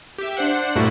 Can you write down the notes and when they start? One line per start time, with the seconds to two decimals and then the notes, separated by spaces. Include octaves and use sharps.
0.18 G4 E5
0.37 D4 C5 F#5
0.76 G2 A#2 G3 A3 E4 F#4